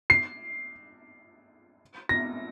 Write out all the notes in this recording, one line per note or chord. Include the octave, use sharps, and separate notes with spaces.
C7
A#6